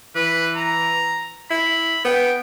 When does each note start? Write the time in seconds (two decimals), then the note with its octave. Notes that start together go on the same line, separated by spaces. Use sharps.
0.15 E3 B4
0.56 A#5
1.50 E4 B5
2.05 B3 G5